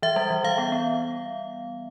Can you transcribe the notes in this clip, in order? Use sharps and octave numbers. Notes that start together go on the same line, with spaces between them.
E3 E5
G3
E3
E3 F5
B3
B3